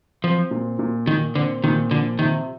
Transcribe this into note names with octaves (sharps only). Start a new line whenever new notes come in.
F3 C4
A#2
A#2
A#2 D#3
D3 C4
A#2 D#3
D3 F3
C3 D#3